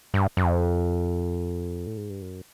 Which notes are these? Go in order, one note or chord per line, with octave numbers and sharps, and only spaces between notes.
G2
F#2
F2
A2
G#2
G2
F#2